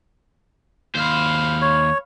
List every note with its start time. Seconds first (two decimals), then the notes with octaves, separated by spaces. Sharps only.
0.95 D#2 C5 F5 B5
1.62 C#5